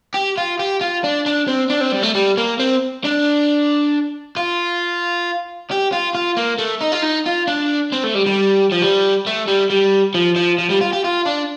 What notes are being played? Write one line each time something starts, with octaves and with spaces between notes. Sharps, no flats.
G4
F4
G4
F4
D4
D4
C4
D4
C4
G3
A3
G3
A#3
C4
D4
F4
G4
F4
F4
A#3
A3
D#4
F4
D#4
F4
D4
C4
A3
G3
G3
F3
G3
A3
G3
G3
F3
F3
F3
G3
F4
G4
F4
D4